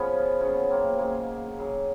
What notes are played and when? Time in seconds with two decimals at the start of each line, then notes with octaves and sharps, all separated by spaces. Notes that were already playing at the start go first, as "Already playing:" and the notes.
Already playing: C#3 F3 B3 C#4
0.40 C#3 F#3 B3 C#4
0.70 A#3 C4
0.98 C#3 F#3 G#3 A#3
1.58 C#3 F#3